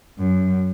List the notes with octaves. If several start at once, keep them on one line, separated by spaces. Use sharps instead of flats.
F#2